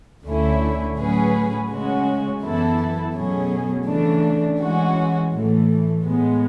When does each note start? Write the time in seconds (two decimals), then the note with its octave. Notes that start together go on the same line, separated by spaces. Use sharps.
0.24 D2 D3 A3 C#4 E4
0.97 A2 F#3 C#4 G#4 B4
1.69 C#3 G#3 C#4 F#4
2.42 F#2 E3 B3 E4 A4
3.15 B2 F#3 A3 C#4 G#4
3.86 C#3 E3 A3 D4
4.59 E3 G#3 C#4 F#4
5.32 A2 E3 A3
6.04 A2 G#3 B3